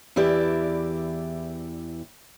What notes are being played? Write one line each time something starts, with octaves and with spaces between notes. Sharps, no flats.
E2 E3 E4 G4 D5